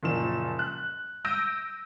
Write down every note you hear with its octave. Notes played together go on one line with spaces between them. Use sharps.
F#1 A#2 F3 E7
F#6
E6 G6 A#6 D7 D#7